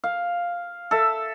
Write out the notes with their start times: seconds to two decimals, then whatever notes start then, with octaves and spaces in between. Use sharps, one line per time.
0.04 F5
0.91 A4 E5